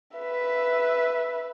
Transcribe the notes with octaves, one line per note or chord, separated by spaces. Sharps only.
B4 E5